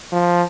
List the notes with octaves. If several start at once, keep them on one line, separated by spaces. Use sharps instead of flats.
F3